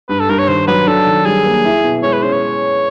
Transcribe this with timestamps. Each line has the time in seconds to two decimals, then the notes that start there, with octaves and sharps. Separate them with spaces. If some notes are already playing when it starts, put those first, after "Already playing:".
0.09 G2 B4
0.20 A4
0.29 G2 A#4
0.39 C#5
0.48 D#3 C5
0.67 F#3 B4
0.87 D4 A4
1.07 D#3
1.26 G3 G#4
1.45 A#3
1.65 E4
1.84 B2
2.03 G#3 C#5
2.13 B4
2.22 C#4 C5
2.33 C#5